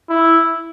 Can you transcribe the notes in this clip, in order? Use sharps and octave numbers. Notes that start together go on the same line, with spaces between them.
E4